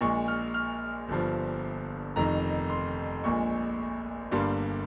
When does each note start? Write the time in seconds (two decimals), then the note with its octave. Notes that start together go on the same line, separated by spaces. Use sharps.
0.01 A#1 A#2 G#3 C#6
0.28 F6
0.54 F6
1.08 G1 G2 F3
2.16 F1 F2 D#3 A#5
2.70 C6
3.24 A#1 A#2 G#3 C#6
4.31 G1 G2 G3 A#3 C6